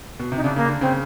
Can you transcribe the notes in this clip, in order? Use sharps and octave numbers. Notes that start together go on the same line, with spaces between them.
B2
C3 D#4
C#3 D4
C#3 A#3
D3
C#3 C4